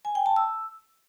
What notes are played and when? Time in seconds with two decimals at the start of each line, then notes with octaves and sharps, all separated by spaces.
0.05 G#5
0.15 G5
0.26 A5
0.36 E6